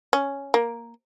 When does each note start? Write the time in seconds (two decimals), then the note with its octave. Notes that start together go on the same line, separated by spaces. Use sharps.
0.13 C#4
0.54 A#3